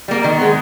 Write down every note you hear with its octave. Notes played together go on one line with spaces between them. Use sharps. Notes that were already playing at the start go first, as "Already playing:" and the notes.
G3 A#3
D#3
B3
G#3